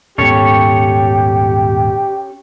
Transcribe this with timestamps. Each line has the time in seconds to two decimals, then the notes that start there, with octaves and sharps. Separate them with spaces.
0.18 D#1 G#2 B3 C#4 G4 A4 C#5